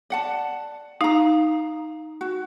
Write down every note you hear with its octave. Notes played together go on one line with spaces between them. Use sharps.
D5 F#5 A5
D#4 F5 A#5
F#4